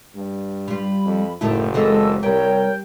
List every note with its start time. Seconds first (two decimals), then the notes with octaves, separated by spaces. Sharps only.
0.16 G2
0.68 G3 F4 B5
1.05 F2
1.41 F#1 F#2 A2 D#3 E4 A4 G5 A5
1.74 D#2 E3 G#3 C4 A4 D#5 E6
2.23 C2 G3 A#4 C#5 G5